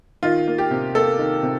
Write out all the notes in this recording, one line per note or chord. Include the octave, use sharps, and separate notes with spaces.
D#3 F4
A#3
G4
C3
A#3 A4
D#3
C3